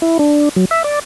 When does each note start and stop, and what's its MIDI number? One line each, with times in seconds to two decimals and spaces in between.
0.02 0.18 64
0.19 0.49 62
0.56 0.65 54
0.71 0.83 76
0.84 0.99 74